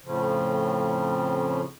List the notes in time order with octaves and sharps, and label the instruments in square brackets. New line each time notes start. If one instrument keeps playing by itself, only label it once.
[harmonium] F2 A2 C#3 F3